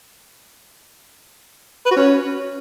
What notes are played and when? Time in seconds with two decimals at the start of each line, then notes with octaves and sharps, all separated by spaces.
1.86 B4
1.91 F#4
1.96 C#4